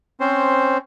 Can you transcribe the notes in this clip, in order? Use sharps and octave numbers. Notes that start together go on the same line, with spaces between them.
C4 C#4 C5